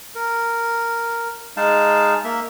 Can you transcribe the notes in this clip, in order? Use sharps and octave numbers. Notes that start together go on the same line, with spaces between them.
A#4
G#3 D#4 F5 A5
A#3 E5